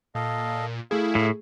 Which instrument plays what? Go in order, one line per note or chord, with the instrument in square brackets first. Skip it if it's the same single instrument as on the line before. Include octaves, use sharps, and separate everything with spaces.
[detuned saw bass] A#2 [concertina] A4 D#5 F5
[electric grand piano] A3 G#4 [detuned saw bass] E4 [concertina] F5
[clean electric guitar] A2